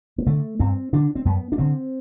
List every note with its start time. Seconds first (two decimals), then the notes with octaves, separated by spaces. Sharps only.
0.18 B3
0.26 D3 A3
0.59 G2 C4
0.93 D3 D4
1.15 C4
1.25 F#2 B3
1.52 D4
1.58 D3 C4